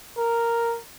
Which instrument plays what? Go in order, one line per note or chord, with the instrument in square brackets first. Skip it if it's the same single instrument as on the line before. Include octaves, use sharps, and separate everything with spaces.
[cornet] A#4